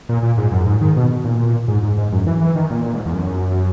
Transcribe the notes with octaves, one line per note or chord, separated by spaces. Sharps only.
A#2
A#2
G#2
F#2
G#2
D#3
B2
A#2
G#2
G#2
G#2
F#2
E3
E3
D#3
A#2
A#2
G#2
E2
F#2